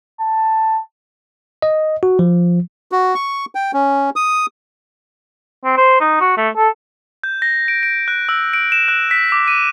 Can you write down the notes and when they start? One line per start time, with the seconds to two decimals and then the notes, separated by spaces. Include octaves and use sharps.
0.20 A5
1.62 D#5
2.03 F#4
2.19 F3
2.92 F#4
3.15 C#6
3.55 G5
3.73 C#4
4.16 D#6
5.64 C4
5.77 C5
6.00 D#4
6.21 F#4
6.37 A3
6.56 A4
7.24 G6
7.42 A#6
7.68 D7
7.83 D7
8.08 F#6
8.29 E6
8.54 D7
8.72 E7
8.88 F#6
9.11 B6
9.32 D6
9.48 D#7